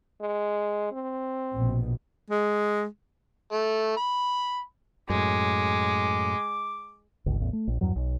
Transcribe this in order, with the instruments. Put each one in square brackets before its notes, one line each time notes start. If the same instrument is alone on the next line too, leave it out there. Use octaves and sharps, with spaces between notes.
[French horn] G#3
C4
[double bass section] A#1 B2
[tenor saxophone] G#3
[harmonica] A3
B5
[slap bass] F#2 A2 [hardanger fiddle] G#3 [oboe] D6
[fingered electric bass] G1 C#2
A1 E2
A3
A#1
E2 G2 F#3
B1